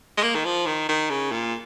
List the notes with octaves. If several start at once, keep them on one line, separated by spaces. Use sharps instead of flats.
G#3
A#3
D#3
F3
D#3
D#3
C#3
A#2